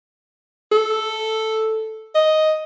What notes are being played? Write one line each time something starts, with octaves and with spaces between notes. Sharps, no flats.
A4
D#5